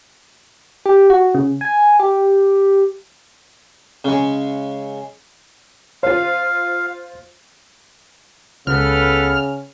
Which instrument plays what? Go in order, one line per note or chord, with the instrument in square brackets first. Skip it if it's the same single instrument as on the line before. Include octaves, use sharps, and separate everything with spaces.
[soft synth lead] G4
F#4
C#3
G#5
G4
[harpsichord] C#3 G#3
[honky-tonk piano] F4 C5 [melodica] F5
[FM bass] C#2 [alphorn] C#3 [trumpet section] B3 A4 B4 [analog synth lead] F6